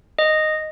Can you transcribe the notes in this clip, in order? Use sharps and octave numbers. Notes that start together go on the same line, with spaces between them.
D#5